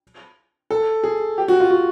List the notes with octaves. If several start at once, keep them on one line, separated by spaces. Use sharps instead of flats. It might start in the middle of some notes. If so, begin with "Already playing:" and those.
A4
G#4
G4
F#4
F4
F#4